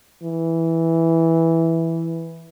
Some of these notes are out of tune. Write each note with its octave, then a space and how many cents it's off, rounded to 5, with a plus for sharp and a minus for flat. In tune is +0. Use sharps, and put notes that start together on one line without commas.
E3 -5